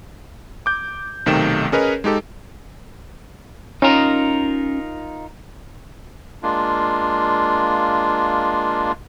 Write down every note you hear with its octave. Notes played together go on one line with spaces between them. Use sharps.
D6 G6
B1 C3 D#3 A3 G5 E7
C#4 G#4 A#4 B4 C#5 D#5
G#3 D#4 G4 A4
C#4 D#4 F4 A#4
G#3 A#3 D4 F4